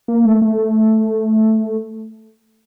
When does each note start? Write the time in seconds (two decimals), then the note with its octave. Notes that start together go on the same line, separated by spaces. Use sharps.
0.08 A#3
0.25 A3
0.42 A3